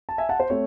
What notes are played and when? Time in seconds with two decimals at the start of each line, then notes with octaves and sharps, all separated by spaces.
0.09 A5
0.18 E5 G#5
0.29 F#5 A5
0.40 C5
0.50 A3 C4 C#5